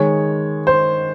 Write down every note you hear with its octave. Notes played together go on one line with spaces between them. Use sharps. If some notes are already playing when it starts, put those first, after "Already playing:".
Already playing: D#3 G#3 C#5
C5